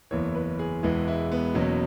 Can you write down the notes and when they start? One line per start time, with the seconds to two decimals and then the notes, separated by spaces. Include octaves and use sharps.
0.11 F#1 E2 E3 C#5
0.35 B4
0.59 G#4
0.82 E1 E2 E3 G#3 E4
1.08 E4
1.32 B3
1.54 F#1 E2 B2 F#3 C#4